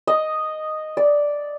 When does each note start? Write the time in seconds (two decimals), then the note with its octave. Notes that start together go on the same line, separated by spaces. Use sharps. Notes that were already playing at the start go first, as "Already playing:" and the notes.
0.07 D#5
0.97 D5